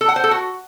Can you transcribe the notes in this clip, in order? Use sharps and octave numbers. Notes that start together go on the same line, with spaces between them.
A4
F#5
C5
A4
F#4